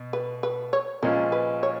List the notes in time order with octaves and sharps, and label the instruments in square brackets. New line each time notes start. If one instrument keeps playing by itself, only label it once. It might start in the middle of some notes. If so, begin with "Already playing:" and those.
Already playing: [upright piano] B2
[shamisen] B4
B4
C#5
[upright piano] A#2 F3 G#3 C#4 [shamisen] A#4
[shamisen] B4
C#5